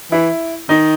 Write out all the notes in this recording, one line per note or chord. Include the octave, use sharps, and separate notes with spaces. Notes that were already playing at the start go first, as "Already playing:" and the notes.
E3 E4
D#3 D#4